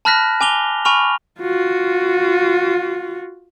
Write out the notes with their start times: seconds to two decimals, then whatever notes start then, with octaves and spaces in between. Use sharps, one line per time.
0.05 A5 B5 F6 F#6 A#6 B6
0.41 G#5 D6 F7 G7
0.85 G#5 B5 C#6 F6 F7
1.40 F4 F#4